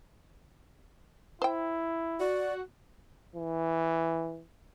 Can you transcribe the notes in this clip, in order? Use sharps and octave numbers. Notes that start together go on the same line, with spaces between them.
E4 C5 G5
F#4 D5
E3